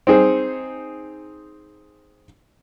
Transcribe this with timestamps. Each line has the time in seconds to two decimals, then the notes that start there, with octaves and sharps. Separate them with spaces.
0.07 C4 D#4 G#4 C5